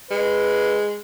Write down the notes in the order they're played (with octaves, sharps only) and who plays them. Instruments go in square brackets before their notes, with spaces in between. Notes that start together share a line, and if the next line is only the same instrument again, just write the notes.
[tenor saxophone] G#3 [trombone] B4